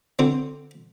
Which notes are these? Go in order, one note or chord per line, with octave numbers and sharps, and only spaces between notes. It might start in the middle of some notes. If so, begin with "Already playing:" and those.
D3 C4